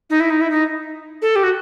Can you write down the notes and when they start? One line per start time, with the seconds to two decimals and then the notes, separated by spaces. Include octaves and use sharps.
0.09 D#4
0.20 E4
0.30 D#4
0.40 E4
0.50 D#4
1.21 A4
1.35 G4
1.43 F#4